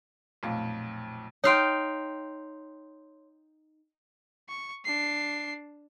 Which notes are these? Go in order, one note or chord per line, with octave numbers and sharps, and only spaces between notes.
B1 F2 A#2 A3 F5
D#4 C#5 F5 G5 C6
C#6
D4 C7